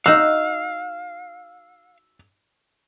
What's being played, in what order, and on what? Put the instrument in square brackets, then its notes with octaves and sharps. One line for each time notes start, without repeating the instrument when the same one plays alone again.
[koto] D#4 F#4 [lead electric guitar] F5 [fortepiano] E6